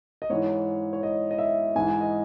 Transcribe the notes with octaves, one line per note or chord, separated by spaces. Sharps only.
D#5
G#2 E3 C#5
C#5
D#5
D#5
E5
G#2 E3 G#5
D#5